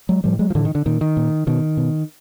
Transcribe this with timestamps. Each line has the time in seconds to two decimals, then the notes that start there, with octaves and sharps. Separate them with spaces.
0.09 F#3 G#3
0.24 A2 F3 G3
0.39 F#3 G#3
0.50 F3
0.55 A2 D3 E3
0.65 D#3
0.75 D3
0.86 A#2 D#3
1.01 D#3
1.17 A#2
1.47 B2 D#3
1.77 B2